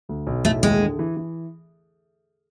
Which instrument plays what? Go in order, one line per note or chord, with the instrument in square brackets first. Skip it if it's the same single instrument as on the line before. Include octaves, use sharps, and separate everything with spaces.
[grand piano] D2
B1
[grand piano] A2 [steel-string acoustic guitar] A3
[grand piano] D#2 [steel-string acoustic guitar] G#3
[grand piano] D3
E3
E3